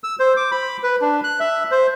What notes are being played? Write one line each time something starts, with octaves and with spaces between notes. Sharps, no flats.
E6
C5
D6
B5
B4
D4
F#6
E5
C5